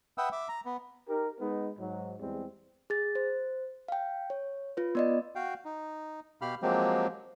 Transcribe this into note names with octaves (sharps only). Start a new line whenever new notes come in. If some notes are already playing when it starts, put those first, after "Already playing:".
B4 E5 F#5 G5 D#6 E6
E5 D6
A#5
B3
D#4 G4 A#4
G#3 B3 D#4
G#2 F#3
E2 G3 G#3 C4
G#4 A6
C5
F5 G5
C#5
F4 B4
B3 D5 D#5
F#4 F5 G5
D#4
B2 G4 F5 B5 F6
F3 F#3 G#3 A#3 C4 G4